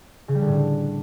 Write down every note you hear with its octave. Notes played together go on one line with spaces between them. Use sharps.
C#3
G3
D3
A2